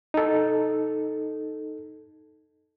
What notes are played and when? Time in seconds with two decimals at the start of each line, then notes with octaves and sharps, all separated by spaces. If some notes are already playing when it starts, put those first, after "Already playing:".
0.14 D#4 A4